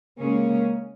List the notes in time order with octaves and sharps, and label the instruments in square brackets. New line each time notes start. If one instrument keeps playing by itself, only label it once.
[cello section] C#3 G#3 C#4 G#4 [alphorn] A#3